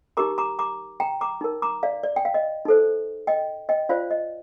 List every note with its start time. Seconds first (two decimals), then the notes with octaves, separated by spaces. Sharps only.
0.17 D#4 G4 A#4 A#5 D6
0.38 A#5 D6
0.59 A#5 D6
1.00 G5 A#5
1.21 A#5 D6
1.41 D#4 A#4
1.62 A#5 D6
1.83 D5 F5
2.03 D5
2.16 G5
2.25 F5
2.34 D#5
2.65 D#4 A4 C5
3.27 D#5 G5
3.69 D#5 G5
3.89 F4 C5 D5 F5
4.11 D#5